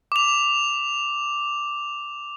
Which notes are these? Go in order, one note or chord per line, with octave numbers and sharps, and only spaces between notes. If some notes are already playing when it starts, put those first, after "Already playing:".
D6 F7